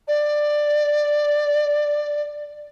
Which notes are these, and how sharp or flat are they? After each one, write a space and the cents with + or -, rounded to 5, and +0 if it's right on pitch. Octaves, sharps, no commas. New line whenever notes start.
D5 +10